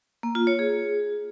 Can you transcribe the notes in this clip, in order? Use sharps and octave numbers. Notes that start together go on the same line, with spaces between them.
A#3
F4
C#5
G#4